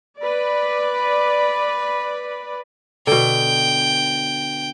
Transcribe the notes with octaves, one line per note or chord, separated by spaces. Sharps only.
B4 D5
B2 D3 G5